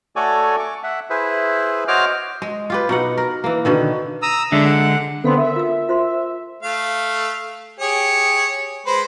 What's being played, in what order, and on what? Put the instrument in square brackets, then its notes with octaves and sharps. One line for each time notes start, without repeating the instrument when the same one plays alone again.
[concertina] A3 F#4 A4 C#5 D5 G#5
C#6 D6
E5 F#5
E4 G#4 B4 C5 E5
F#4 C5 C#5 D#5 D6 F6
[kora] G#3
F4 G4 B4
B2 D#4 F#5
A#4
E3 A#3
B2 D3 D#3
[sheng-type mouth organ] A#5 D#6 E6
[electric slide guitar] D3 G#3 [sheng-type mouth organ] D4 E5
[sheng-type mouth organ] F#5
[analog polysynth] D3 B3 C4 [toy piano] A4 F5 C6
[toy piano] A4 A#4 [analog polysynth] E5
[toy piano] F4 E6
F4 C5 C6
[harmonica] A3 F5
G4 G#4 C#5
G#3 B4 C5